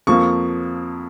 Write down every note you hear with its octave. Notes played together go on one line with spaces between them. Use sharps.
F2 F3 A#3 C#6